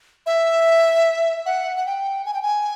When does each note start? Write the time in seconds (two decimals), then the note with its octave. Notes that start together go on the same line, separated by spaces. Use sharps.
0.26 E5
1.46 F#5
1.77 F#5
1.86 G5
2.26 G#5
2.34 G5
2.42 G#5